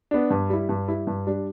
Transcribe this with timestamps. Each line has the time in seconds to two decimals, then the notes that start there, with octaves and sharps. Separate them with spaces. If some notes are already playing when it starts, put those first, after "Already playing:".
0.11 B3 D4
0.30 G2
0.50 G3 E4
0.69 G2
0.88 G3 E4
1.07 G2
1.27 G3 D4